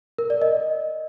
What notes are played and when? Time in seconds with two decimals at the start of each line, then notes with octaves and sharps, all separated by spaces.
0.19 A#4
0.30 D5
0.42 D#5